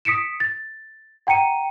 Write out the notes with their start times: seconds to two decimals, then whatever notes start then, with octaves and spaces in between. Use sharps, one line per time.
0.05 D#6 B6 C#7 D7 E7
0.40 A6
1.27 F#5 G5 A#5 C#7 D#7